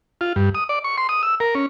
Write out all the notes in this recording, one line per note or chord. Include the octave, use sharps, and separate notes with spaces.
F4
G2
D#6
D5
C#6
C6
D#6
E6
A#4
C#4